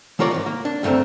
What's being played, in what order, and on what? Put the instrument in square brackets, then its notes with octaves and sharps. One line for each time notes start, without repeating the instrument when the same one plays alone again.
[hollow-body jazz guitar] E3 A3 F4 A#4 C#5 D5
G#2 D#3
A#3
D4
D2 G2 A3 C4 A#4